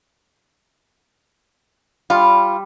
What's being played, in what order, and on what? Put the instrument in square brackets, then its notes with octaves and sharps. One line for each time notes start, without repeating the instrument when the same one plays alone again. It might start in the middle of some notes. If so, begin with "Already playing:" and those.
[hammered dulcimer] G3 [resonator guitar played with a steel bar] F4